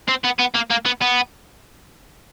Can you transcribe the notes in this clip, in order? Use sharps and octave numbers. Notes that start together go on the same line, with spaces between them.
C4
B3
B3
A#3
A#3
B3
B3